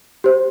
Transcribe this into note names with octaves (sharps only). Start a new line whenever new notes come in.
G4 C5